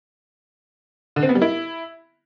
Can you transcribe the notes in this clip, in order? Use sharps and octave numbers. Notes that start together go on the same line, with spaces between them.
D3
C4
B3
G3
E4